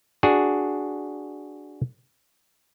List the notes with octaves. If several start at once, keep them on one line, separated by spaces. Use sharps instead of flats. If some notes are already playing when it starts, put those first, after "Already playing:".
D4 F#4 G#4